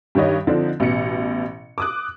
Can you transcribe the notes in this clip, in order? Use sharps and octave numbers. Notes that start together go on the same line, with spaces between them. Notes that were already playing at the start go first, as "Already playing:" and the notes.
G2 D#3 C#5 D#5
D3 F3 C4 D4 D#4
A1 B2 C#7
D6 D#6 F#6